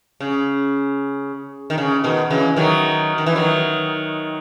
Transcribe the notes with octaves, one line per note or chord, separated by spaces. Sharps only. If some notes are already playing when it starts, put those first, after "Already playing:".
C#3
D#3
C#3
B2 D#3
C#3 E3
D#3 F#3
D#3
E3
D#3 F#3